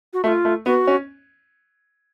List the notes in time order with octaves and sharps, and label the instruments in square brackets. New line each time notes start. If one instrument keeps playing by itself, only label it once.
[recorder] F#4
[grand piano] A3 [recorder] F#4
[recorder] F4
[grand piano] A3
[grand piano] B3 [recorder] F#4
[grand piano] C#4